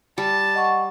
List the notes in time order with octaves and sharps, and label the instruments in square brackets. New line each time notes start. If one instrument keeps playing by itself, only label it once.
[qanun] G3 [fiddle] A5
[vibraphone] D#5 F#5 C#6